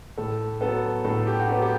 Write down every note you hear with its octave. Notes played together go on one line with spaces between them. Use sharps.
A2 A4
F#3 B3 A4
A2 A4
G4
F#4
F#3 B3 G4
G4